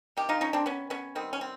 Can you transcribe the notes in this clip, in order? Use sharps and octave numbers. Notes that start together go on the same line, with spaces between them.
C3 D#3 G4
D#4 F4
C#4 D#4
C4 D4
B3 C#4
B3 C#4
D#3 G3 B3 C4
C#4
C4